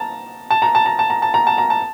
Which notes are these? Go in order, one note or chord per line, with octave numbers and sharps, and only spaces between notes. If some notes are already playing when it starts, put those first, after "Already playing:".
Already playing: A5 A#5
A5
A#5
A5
A#5
A5
A#5
A5
A#5
A5
A#5
A5